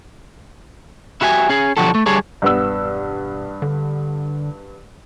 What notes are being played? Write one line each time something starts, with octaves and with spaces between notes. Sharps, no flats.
E4 F#4 G4 E5 G#5
C#4 G#4
B1 D3 F3 F#4 G4 A4
A3
D3 G3 G#4 A4 C#5
E1 G2 B3 E6
D3